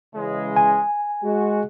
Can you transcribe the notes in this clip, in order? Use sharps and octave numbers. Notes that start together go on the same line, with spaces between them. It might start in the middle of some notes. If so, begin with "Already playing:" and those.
C#3 E3 G#3
G#5
G#3 F#4